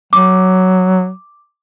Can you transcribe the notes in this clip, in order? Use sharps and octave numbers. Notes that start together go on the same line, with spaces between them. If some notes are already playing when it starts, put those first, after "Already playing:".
F#3 D6